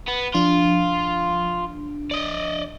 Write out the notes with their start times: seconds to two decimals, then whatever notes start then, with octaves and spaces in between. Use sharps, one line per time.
0.08 B3
0.35 F3 D4 F4
2.11 D5 D#5